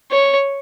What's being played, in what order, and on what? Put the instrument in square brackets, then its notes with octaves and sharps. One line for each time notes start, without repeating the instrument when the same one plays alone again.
[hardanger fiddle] C#5